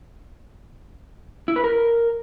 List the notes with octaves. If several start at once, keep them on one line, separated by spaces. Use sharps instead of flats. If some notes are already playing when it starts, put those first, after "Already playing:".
E4
B4
A#4